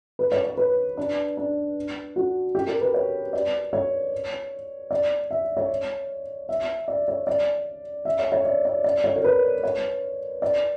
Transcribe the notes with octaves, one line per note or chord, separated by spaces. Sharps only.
B4
C#5
C#5
B4
D4
D4
F#4
G4
A#4
B4
C#5
D5
C#5
D5
E5
C#5
E5
D5
C#5
D5
E5
C#5
C#5
D5
D5
D5
C#5
A#4
B4
C#5
D5